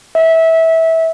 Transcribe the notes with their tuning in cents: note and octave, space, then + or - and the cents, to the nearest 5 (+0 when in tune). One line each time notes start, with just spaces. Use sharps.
E5 -20